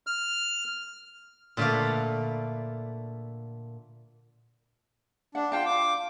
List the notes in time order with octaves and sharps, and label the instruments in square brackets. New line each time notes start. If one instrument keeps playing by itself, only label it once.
[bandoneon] F6
[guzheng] A#2 D3 A3 B4 D5 F5
[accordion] D4 [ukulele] F#5
[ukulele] F4 F5 A5 [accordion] G5
[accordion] D6